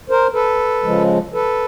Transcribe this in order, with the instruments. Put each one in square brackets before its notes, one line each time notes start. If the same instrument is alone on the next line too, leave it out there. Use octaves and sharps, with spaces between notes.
[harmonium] A#4 C5
A4 B4
C#3 F3 G#3
A4 B4